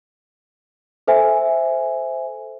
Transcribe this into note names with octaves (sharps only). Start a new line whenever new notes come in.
A4 C5 E5 G#5